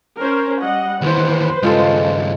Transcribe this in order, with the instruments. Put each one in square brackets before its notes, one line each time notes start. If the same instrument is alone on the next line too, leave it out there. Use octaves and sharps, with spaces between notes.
[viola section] C#4 A#4 C5
G3 D#5 F#5
[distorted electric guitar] D#2 E3 [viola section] B4 C5
[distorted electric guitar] G2 C#3 [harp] G#3 F4 A4